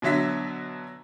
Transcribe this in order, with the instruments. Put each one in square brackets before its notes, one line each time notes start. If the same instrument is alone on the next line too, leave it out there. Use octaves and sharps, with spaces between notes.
[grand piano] B2 D3 F#3 E5 B6